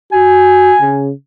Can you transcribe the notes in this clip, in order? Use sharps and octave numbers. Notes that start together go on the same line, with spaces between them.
F#4 G#5
C#3